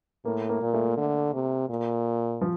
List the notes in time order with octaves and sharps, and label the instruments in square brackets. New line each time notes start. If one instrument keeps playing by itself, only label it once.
[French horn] A2 [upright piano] A#3
[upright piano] A#3
[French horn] A#2
[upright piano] A3
[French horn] D3
C3
A#2
[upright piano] F3